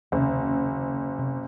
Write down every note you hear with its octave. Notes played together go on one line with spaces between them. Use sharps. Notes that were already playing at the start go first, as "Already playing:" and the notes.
F#1 D#2 C3
C3